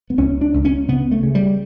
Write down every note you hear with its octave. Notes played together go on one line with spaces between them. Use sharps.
B3
C#2 C#4
D4
C#2
C#4
C#3 B3
A3
C#3
G3